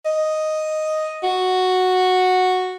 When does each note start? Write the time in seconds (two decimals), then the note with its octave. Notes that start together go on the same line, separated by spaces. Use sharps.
0.06 D#5
1.23 F#4